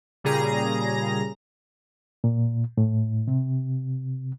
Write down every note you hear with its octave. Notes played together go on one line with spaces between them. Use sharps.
A#2 C#3 G3 G#4 A#5 A#6
A#2
A2
C3